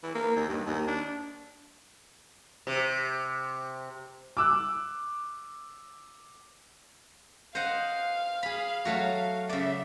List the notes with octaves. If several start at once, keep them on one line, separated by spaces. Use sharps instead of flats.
E3
A#3
D#2
G2
D#2
D4
C3
D6 E6 F#6
C5 D#5 F5 F#5
G#4 B5
F#3 A3 F#4
C#3 D5 E5